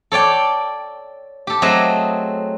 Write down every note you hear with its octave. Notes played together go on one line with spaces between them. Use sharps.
A4 C#5 D5 G5
G4 A4
F#3 A3 C4 G#4 D#5